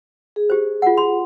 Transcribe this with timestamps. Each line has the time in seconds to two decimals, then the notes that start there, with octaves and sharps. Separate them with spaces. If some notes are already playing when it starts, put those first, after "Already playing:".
0.36 G#4
0.50 G4 C5
0.82 F4 F#5
0.97 C6